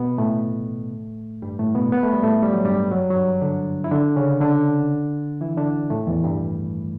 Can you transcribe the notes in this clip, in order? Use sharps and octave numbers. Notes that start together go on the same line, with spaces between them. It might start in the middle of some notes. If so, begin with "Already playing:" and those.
Already playing: B2 B3
A2 A3
G2 G3
A2 A3
B2 B3
B3
A3
G3
A2 A3
G3
F#3
G2 G3
F#2 F#3
F#3
G2 G3
D3 D4
E4
D3 D4
C#3 C#4
D3 D4
E3 E4
D3 D4
A2 A3
E2 E3
G2 G3